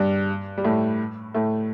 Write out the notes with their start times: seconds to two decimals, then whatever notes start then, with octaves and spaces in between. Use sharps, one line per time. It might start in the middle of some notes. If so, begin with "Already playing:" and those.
Already playing: G2 G3
0.58 G3
0.64 A2 A3
1.34 A2 A3